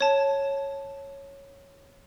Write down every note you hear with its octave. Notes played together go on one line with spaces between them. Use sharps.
C#5 A5